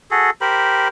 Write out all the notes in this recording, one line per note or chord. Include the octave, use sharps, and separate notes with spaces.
F#4 G#4 A4
G4 A#4 C5 B5